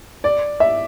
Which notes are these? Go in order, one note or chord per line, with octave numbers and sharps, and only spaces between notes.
D5
E5